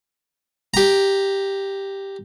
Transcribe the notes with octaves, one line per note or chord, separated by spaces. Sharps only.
G4 A#5